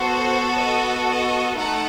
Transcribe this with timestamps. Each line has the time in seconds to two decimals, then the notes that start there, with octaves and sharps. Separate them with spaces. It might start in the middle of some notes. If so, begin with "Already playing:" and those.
Already playing: B3 F#4 A4 C5
0.59 D#5
1.08 D#5
1.57 A3 D#4 A4 F#5